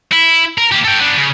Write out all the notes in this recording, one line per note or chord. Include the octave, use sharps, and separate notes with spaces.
E4
A#4
A#3 G4
A4 G5
B3 D4
C#3